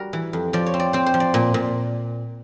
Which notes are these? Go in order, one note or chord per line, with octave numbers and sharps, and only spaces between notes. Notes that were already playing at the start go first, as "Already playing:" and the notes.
Already playing: G3 F#4 A#4
E3
F2
F3 D5
C#5
C4
D5
C4 C5
C5
F3
D5
A#2
A#2